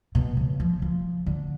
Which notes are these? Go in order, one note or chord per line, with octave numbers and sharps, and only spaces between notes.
B2
C#3
F3
F3
D3